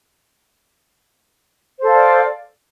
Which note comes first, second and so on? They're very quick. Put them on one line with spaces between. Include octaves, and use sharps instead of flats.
C5 A4 F5 D5